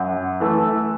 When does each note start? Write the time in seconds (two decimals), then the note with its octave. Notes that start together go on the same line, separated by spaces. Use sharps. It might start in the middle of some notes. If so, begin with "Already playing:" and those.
Already playing: F#2
0.40 E3 A3